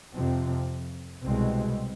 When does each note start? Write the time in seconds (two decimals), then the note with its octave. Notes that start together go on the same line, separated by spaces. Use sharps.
0.13 F2 C3 F3 C4
1.24 C2 B2 G#3 C4